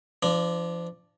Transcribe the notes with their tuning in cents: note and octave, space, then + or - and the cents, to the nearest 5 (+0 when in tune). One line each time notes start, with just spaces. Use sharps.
F3 -35 D4 +0